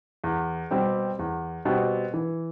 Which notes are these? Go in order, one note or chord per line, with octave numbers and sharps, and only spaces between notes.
E2
B2 G3 C4 G4
E2
B2 G3 C4 G4
E3